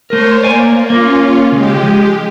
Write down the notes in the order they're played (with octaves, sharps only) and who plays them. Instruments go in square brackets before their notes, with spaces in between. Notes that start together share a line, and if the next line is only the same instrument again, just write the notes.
[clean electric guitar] A3 A#4 [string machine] C5 C#5
[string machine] A#3 [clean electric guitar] D5 G#5
[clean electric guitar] A#3 [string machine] C#4 F4
[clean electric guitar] C#3 [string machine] G#3 G4
[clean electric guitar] F3